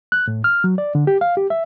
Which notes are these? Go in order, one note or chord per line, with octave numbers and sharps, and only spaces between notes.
F#6
A2
F6
F#3
D5
D3
G4
F5
G4
E5